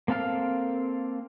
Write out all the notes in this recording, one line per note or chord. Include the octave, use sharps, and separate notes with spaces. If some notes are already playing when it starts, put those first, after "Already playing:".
A#3 C4 A4 F5 F6